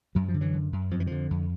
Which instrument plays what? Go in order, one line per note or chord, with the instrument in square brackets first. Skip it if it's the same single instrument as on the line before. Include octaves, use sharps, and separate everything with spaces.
[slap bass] F#2 F#3
F3
D3
E3 F#3
F#2
F#2
F2 F3
E3
D3 D#3 F3
F2